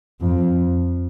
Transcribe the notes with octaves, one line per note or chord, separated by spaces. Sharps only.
F2